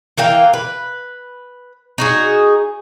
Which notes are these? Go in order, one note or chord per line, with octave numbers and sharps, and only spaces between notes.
E3 A#3 F5 G5
B4
D#4 F#4 G#4